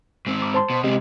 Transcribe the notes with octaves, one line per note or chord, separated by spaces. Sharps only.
G#2 C4
D6
C5 A5 C6
B2
C3 G#3 C4 G4 D#5